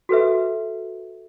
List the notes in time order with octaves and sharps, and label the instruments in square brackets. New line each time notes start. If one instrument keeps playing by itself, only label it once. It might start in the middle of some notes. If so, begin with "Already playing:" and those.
[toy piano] F#4 A4 B4 E5